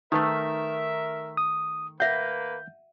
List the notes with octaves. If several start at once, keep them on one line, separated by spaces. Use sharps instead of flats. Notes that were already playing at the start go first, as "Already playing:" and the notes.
D#3 A3 D#4 A#4 B4 E5
D#6
A#3 B4 E5 F#5 G6